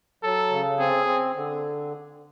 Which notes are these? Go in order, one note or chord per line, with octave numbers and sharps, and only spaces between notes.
F#3 A4
C#3
C4 G#4
C4
D3